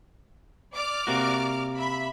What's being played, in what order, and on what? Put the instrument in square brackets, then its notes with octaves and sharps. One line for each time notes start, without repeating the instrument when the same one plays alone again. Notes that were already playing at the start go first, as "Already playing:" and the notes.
[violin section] D5 D6 F6
[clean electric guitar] C3 A#3 F#4
[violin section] E5 B5